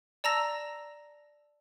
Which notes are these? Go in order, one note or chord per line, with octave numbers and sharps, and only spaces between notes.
D5 A5 A#5 E6 A#6 F7